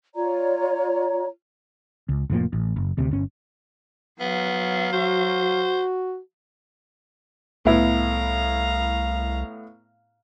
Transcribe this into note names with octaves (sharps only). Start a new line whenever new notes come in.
F4 C#5 D5 A#5
C#2
F1 A2 F3 A#3
A1
F#1
D2 C3
G1 C#4
F#3 B3 F5
F#4 C5
C2 A2 B3 E4 F5 A#5